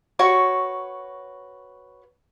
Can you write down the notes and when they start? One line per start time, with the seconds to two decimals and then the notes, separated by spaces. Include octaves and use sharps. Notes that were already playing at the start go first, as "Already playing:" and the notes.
0.19 F#4 B4 C#5 C#6